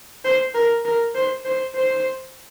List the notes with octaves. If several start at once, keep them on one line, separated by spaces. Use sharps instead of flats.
C5
A#4
A#4
C5
C5
C5